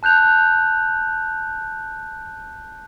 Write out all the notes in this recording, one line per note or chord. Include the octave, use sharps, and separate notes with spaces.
A5 F#6 G6 F7